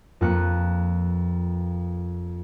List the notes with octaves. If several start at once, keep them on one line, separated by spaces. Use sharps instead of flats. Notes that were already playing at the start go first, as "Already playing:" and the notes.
F2 A#3 F4 B4 F#6 C#7